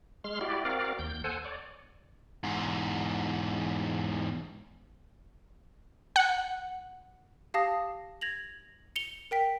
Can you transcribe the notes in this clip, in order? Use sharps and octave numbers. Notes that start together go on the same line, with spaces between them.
G#3 C6 F6
E4 F#4 G4 D5
C4 F#4 A#4 D5 F5
D#2 G6
A4 C5 F#5 G#5
C#5 D5
E2 G#2
F#5
G4 F5 A5 D#6 A#6
G#6 A#6 F7 F#7
C#7 F7 G7
A#4 G5 B6